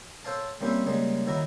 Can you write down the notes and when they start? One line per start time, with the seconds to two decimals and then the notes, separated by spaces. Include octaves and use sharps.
0.25 A4 C5 C#5 F5 A5
0.61 G3 A#3 C4 C#4 E4 G4
0.86 C#3 G3 G#3 A#3
1.27 D#3 F#3 E4 A#4